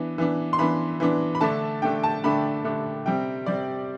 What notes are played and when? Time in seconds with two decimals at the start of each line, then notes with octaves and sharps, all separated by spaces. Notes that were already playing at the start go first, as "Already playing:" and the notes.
Already playing: E3 B3 D4
0.18 E3 B3 D4
0.53 C6
0.59 E3 B3 D4 B5
1.00 E3 B3 D4
1.35 B5
1.41 D3 A3 D4 A5
1.82 D3 A3 D4 G5
2.03 A5
2.24 D3 A3 D4 B5
2.64 D3 A3 D4
3.05 C3 G3 C4 G5
3.46 C3 G3 C4 D5